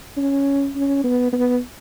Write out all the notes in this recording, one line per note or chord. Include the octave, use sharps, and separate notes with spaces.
C#4
C#4
B3
B3